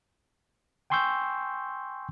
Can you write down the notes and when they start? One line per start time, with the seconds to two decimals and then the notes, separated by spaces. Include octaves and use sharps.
0.90 G5 G#5 C6 C#6 E6 G6